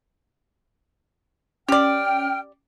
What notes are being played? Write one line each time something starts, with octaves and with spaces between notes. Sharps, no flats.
C#4 G4 D5 G5 F6